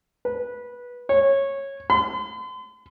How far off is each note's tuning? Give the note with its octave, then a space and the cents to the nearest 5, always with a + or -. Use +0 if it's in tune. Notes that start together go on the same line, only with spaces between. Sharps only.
B4 -15
C#5 -15
C6 -45